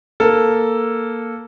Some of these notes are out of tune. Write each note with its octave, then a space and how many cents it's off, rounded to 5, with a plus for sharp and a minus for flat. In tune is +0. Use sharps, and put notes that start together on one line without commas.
A#3 +0 A4 +0